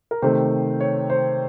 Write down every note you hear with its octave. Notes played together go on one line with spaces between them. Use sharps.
A#4
C3 D#3 A3 C5
C#5
C5